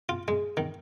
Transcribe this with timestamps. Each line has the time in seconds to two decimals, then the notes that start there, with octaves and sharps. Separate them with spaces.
0.09 F4
0.28 G#3
0.57 D#3